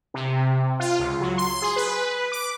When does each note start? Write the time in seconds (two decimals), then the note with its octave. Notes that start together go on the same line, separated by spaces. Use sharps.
0.14 C3
0.80 F4
0.99 C#2
1.21 F#3
1.38 C6
1.62 G#4
1.76 B4
2.32 D6